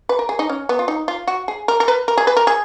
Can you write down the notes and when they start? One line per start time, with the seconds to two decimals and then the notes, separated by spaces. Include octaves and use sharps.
0.09 B4
0.19 A#4
0.29 G#4
0.39 D#4
0.49 C#4
0.69 B3
0.79 F4
0.88 D#4
1.08 F4
1.27 F#4
1.48 G#4
1.68 A#4
1.80 A#4
1.88 B4
2.08 A#4
2.17 G#4
2.27 B4
2.37 A#4
2.47 G#4